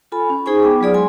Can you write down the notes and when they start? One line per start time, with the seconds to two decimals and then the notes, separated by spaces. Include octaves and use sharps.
0.12 F4 A4 G#5 B5
0.30 C#4
0.46 D#4 G#4 C5 G#5 C#6
0.63 B3 G5 D6
0.81 F#3 F4 G#4 D5 D#6
0.94 G#3 G#5 C6